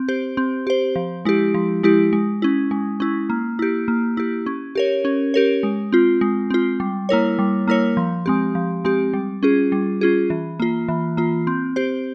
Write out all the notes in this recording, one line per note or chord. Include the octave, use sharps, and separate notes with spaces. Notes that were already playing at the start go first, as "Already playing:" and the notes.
Already playing: C4
G4 C5
C4
G4 C5
F3
G#3 E4 G4
F3
G#3 E4 G4
G#3
C#4 E4
G#3
C#4 E4
A#3
E4 G4
A#3
E4 G4
C#4
G4 A#4 C#5
C#4
G4 A#4 C#5
G#3
C4 F4
G#3
C4 F4
G3
A#3 E4 A#4 C#5
G3
A#3 E4 A#4 C#5
F3
G#3 C4 G4
F3
G#3 C4 G4
G3
C#4 F4 G#4
G3
C#4 F4 G#4
E3
A#3 F4
E3
A#3 F4
C4
G4 C5